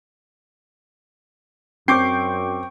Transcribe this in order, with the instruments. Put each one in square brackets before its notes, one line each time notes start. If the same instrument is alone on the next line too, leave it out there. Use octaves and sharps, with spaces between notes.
[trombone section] F#2 [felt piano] C4 [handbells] G5 C#6 [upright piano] D6 G6 C7